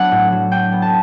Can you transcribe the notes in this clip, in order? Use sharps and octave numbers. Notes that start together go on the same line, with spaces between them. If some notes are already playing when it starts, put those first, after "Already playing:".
Already playing: F#3 B3 D4 F#5
A2
F#3
D4 G5
B3
A5